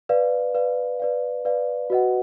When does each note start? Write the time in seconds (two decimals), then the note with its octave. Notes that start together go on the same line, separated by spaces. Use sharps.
0.09 B4 D5 F5
0.55 B4 D5 F5
1.00 B4 D5 F5
1.45 B4 D5 F5
1.90 F#4 B4 D#5 F#5